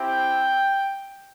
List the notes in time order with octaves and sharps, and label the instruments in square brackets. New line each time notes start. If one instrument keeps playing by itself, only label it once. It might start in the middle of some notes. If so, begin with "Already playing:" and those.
Already playing: [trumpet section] C4 E4 G4 G5